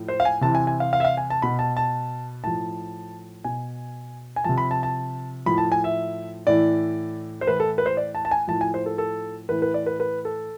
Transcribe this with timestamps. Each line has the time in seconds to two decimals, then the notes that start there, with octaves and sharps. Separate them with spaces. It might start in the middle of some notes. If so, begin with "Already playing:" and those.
Already playing: A2 F3
0.08 C5
0.20 F5
0.25 G#5
0.41 C3 E3 A5
0.55 G#5
0.67 G#5
0.80 F5
0.93 F5
1.00 E5
1.05 F5
1.17 G#5
1.30 A5
1.42 B2 B5
1.59 A5
1.77 A5
2.44 A2 F3 A5
3.44 B2 G#5
4.36 G#5
4.44 C3 F3 A5
4.58 B5
4.71 A5
4.83 A5
5.46 A2 F3 B5
5.58 A5
5.72 G#5
5.84 E5
6.47 A2 E3 D5
7.41 C5
7.47 A2 E3 B4
7.60 A4
7.78 B4
7.86 C5
7.97 D5
8.15 A5
8.25 A5
8.31 G#5
8.48 A2 F3 A5
8.61 G#5
8.74 C5
8.86 A4
8.98 A4
9.49 A2 E3 B4
9.62 B4
9.74 D5
9.86 B4
10.00 B4
10.25 A4